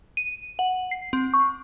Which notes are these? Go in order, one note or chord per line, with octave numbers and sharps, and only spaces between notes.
D#7
F#5
C7
C4
C#6